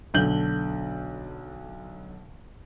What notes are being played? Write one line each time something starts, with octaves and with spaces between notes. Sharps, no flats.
B1 D3 G6 F#7